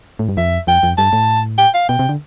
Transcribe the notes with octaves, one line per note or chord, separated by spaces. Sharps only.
A2
G2
F2 E5
F2 G5
F2
G2 A5
A2
G5
F5
B2 G5
C3
D3